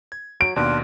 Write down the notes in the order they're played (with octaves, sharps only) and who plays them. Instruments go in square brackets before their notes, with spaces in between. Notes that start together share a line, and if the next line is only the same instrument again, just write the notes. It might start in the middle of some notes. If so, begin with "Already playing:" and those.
[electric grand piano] G#6
[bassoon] F#3 [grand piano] D7
[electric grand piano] D#2 B2 [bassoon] D4 [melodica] F4 B4